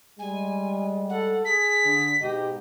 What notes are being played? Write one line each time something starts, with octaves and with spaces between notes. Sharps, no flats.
G3 G#3 G#5
A4 F#5
G#4 B6
D3
G#2 B2 G4 D#5